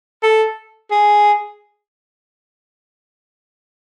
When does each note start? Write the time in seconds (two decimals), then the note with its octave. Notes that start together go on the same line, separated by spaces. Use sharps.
0.23 A4
0.91 G#4